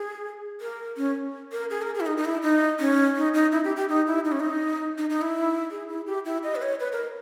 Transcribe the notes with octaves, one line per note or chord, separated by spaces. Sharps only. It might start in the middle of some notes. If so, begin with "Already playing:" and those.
Already playing: G#4
A#4
C#4
A#4
G#4
A#4
G#4
E4
D#4
D#4
E4
D#4
C#4
D#4
D#4
E4
G4
G4
D#4
E4
D#4
C#4
D#4
D#4
D#4
E4
G#4
E4
G4
E4
D#5
B4
C#5
B4
A#4